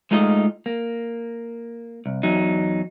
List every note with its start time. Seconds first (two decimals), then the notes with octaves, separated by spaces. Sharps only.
0.11 G#3 A3 D#4 F4 C#5 D#5
0.66 A#3
2.06 C2
2.23 E2 F#3 D#4